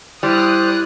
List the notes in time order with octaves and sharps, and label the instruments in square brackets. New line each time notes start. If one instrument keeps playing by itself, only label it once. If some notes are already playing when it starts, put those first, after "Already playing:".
[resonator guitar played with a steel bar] G3 [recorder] E4 [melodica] C5 D5 [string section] D#6 F6 F#6